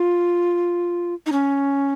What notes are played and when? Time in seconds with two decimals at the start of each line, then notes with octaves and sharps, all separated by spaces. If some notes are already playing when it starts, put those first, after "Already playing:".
Already playing: F4
1.26 D#4
1.32 C#4